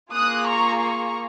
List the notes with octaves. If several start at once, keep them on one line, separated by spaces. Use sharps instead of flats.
A#3 F4 G#4 D#6 F#6
A#5 C#6
A#5 C#6